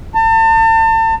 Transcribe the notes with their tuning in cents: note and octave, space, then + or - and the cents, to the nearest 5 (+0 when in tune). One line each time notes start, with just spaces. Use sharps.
A5 +35